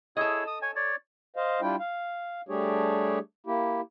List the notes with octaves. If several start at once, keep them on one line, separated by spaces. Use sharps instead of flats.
E4 G#4 A4 C#5 D#5
D#6
C#5 G#5
C#5 D5
C5 D#5 F5
G3 D4 E4 F4 G5
F5
G3 A3 D4 G4 G#4 C#5
A#3 E4 G4